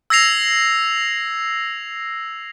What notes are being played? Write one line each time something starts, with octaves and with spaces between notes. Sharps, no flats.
E6 G#6 A#6 C7 F7